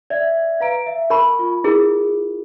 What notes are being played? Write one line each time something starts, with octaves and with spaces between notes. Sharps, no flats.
D5 E5 G#6
B4 F5 A#5 D7
E5
A#4 A5 B5 C#6
F4
E4 G#4 A#4